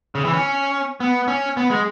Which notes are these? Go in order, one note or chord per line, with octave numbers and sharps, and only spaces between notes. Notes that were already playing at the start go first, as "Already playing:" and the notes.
C#3
E3
C#4
B3
C#4
B3
G#3